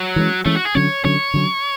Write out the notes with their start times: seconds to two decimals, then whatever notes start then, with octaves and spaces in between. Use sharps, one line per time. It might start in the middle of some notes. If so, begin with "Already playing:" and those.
Already playing: F#3
0.16 E3 G#3 C#4
0.45 E3 G#3 A3 C#4
0.56 F#4
0.65 G#4
0.75 D3 F#3 C#4 C#5
1.04 D3 F#3 C#4 C#5
1.34 D3 F#3 C#4